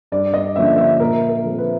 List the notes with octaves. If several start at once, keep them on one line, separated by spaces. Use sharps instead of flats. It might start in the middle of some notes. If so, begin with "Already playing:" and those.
G2 D5
D#5
D3 F3 A#3 C#4 E5
E5
A#2 A#4
A#4
F3 A3 C4
B4